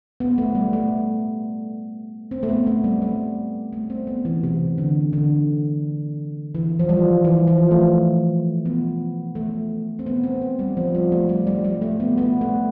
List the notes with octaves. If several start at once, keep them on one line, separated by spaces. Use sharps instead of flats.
B3
A3
G3
A3
C4
A3
B3
A3
G3
G3
A3
C4
B3
E3
C3
D3
D3
E3
F3
G3
E3
F3
A3
B3
A3
C4
B3
C4
B3
G3
F3
G3
A3
G3
G3
G3
A3
B3
B3
A3